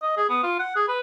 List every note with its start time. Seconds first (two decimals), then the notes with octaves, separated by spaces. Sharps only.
0.02 D#5
0.17 G#4
0.29 B3
0.43 F4
0.59 F#5
0.76 G#4
0.88 B4